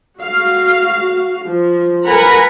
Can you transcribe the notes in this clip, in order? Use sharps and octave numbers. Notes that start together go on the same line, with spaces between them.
F#4 F5
F3
A#4 B4 F#5 G#5 A#5 B5